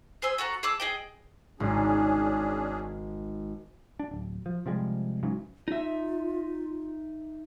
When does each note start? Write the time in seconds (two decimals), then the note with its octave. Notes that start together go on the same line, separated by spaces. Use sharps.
0.22 G#4 C5 G#5 E6
0.38 F#4 A4 F#5 A#5
0.63 G#4 A5 D6 E6
0.80 G#4 D#5 G5
1.60 G#1 C#4 D4 G#4
3.99 D4
4.11 D1
4.46 F3
4.66 C3 F3 G3 G#3
5.23 G#2 C#3 E3 F#3
5.68 D#4 F4 E5